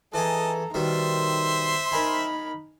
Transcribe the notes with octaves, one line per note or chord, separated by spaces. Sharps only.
E3 G#4 A4 D#5 A5 A#5
B2 D#3 G3 D#4 C5 E5 C6
D#4 A#4 D#5 G#5 B5